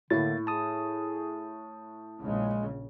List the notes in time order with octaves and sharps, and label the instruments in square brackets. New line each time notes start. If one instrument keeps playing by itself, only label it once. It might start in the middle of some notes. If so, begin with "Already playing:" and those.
[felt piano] A2 [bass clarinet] D3 [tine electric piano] A#3 E4 A6
[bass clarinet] G#4 [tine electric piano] A5 D#6
[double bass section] A#1 C#3 [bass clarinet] G#3